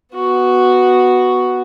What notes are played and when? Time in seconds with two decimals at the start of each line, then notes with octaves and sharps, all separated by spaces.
0.14 B3 F#4